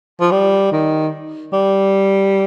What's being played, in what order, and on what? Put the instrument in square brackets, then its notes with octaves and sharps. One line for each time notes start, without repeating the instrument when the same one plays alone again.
[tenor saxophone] F3
G3
D#3
G3